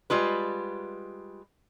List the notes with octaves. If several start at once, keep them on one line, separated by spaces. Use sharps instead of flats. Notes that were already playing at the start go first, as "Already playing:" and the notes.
G3 G#3 F4 B4